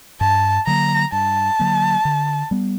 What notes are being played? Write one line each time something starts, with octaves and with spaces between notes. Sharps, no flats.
G2 A5
D3 F#3 A#3 A#5
G2 A5
D3 F#3 A#3
D3
G3 B3